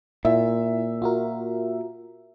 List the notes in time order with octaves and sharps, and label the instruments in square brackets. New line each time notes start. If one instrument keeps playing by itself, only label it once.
[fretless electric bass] A#2 [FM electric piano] E4 [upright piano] E5
[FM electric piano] F4 F#4 A#4